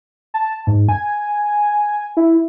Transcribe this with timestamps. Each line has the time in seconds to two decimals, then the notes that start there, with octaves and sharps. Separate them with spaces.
0.34 A5
0.67 G#2
0.89 G#5
2.17 E4